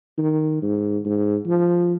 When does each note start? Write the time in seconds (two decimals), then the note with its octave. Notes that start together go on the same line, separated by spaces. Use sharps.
0.18 D#3
0.62 G#2
1.05 G#2
1.46 F3